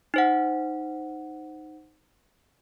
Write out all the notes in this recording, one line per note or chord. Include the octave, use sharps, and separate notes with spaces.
D#4 C5 F#5